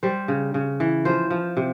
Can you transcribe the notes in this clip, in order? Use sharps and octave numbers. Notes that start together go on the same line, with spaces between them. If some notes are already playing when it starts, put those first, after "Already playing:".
G3 C5
C#3
C#3
E3
F3 C5
F3
C3